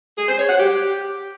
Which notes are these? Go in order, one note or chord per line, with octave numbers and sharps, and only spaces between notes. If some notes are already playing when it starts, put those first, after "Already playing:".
G#4
C5
C#5
F#5
G4